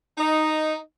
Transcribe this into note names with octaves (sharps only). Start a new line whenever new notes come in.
D#4